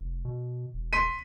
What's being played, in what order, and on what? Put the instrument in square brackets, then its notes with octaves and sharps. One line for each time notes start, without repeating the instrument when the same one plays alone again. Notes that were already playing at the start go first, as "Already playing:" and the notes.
[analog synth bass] F1
B2
E1
[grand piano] C6 B6 D#7